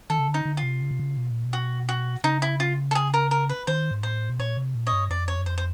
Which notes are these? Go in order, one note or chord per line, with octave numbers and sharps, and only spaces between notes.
D#3 A4
C#3
D3
D#4
D3
F4
C3
C#3
C3
C#3
B2
A#2
B2
F#4
F#4
C#3 D#4
E4
F4
A4
G#4
A#4
A#4
B4
D#3 C5
G#2
A2 C5
B2
A#2 C#5
C3
A#2
C#5 D#5
G2
F2 D5
C#5
F#2
F2 C5
C5